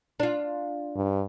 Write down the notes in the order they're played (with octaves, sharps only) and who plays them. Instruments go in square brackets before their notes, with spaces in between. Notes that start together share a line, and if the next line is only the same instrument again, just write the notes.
[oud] D4 F4
[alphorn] G2